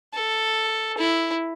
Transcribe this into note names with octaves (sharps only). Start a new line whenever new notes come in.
A4
E4